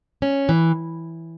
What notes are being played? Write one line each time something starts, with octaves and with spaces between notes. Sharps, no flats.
C#4
E3